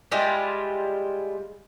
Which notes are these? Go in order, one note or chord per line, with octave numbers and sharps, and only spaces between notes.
G3 G#3 E4 F4